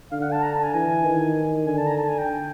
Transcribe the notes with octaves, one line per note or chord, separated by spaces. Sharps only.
D3 F5
F#5
A5
A#5
A5
G#5
E3 G#5
D#3
D3 G#5
A5
A#5
A5
G#5
G5